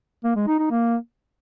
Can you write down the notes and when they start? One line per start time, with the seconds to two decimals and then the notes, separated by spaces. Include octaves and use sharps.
0.24 A#3
0.36 G#3
0.47 D#4
0.59 D#4
0.71 A#3